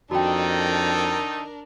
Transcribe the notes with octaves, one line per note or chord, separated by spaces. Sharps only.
F2 D#3 D4 D#4 F#4 A4 A#4 G5